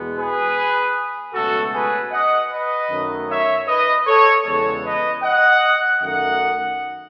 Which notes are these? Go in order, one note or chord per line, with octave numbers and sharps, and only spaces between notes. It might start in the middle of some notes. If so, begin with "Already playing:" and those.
Already playing: E2 B2 G#3 B3
G#4 B4
C#2 B2 F#3 A3 F#4 A4
G#4 B4
D#5 F#5
B4 D#5
F#2 D#3 F#3 A3
C#5 E5
B4 D#5
A4 C#5
E2 C#3 G#3 B3 A4 C#5
B4 D#5
D#5 F#5
F#2 D#3 A3 D#5 F#5